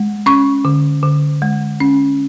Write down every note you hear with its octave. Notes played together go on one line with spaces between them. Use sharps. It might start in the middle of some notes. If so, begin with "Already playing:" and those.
Already playing: G#3
C#4 C#6
D3
D3
G#3
C#4